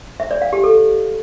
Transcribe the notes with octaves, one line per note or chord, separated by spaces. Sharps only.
E5
D5
F5
G4
A4